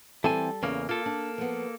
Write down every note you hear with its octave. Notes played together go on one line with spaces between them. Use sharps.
E3 G3 C4 A4 G#5
E2 C#3 A#3 C#4
A#3 F4 A4
D4
F3 B3